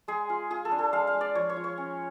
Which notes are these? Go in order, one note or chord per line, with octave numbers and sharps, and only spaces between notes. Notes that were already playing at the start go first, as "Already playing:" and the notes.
G#3 G#4
F4
F4 G#4
A4
D4
A4
G#3 F5
F5
G#3
D5
F3 C#5
C#5
F4
C#5
C#4